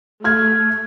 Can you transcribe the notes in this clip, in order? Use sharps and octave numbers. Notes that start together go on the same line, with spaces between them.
A3 F6 G#6